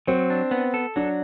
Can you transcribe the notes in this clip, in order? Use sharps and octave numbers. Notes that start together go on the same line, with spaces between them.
F#3 C4
D4
B3
A4
F#3 D4